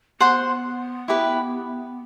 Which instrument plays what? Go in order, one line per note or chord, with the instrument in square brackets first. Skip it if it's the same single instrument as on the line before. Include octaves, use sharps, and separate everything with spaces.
[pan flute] B3 [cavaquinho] C5 F#5 C6
[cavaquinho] E4 G4 B4